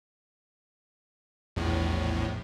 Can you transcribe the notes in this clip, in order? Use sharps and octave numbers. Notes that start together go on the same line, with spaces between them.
A#1 E2 A2